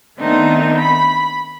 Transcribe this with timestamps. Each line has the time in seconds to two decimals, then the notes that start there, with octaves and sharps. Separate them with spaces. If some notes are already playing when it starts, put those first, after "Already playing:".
0.18 D#3 A3 B3 C4 D4 D#4
0.77 B5